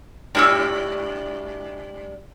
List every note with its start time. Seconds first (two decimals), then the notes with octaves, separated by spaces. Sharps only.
0.35 G#2 G3 D4 E4 F#4 E6